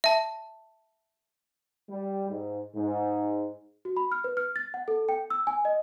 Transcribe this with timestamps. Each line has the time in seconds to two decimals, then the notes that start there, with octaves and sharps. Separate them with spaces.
0.04 E5 A5
1.90 G3
2.29 G#2
2.75 G#2
3.85 F#4
3.97 B5
4.12 F6
4.24 B4
4.37 F6
4.56 A6
4.74 F#5
4.88 A4
5.09 G5
5.30 E6
5.47 G#5
5.65 D#5